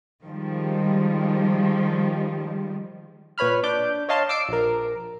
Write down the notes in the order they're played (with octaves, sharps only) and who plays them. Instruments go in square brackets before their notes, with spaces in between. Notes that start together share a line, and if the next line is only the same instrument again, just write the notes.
[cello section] D#3 F3 G3 G#3
[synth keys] A#2 B4 C#5 B5 F6
D4 D6 G6
C#5 D#5 F5 A5 C6
D6 E6 C7 D7
A#1 A#4